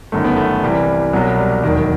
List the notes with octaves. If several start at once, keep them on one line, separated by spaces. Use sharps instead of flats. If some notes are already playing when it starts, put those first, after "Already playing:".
G1 F#2 D#3 A3
B3
A3
C2 C3 E3 G3
C2 B2 F#3
G3
E1 D#2 D#3 F#3